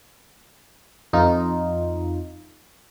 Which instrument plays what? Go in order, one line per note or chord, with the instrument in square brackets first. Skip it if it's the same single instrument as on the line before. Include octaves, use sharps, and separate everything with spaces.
[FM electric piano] F2 D#4 F4